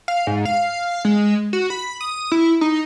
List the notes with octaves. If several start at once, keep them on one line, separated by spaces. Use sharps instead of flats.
F5
G#2
F5
G#3
F#4
B5
D#6
E4
D#4